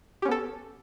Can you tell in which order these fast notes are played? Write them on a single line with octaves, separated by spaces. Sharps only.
G4 C#4 B3 A4